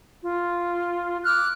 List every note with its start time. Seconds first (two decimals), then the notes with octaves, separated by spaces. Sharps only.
0.23 F4
1.25 D6 F6 F#6